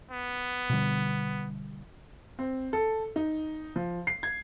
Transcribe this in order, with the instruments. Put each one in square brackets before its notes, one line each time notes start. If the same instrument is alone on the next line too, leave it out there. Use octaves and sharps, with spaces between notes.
[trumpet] B3
[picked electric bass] B2 D3 G3
[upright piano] C4
A4
D#4
F3
C7
G#6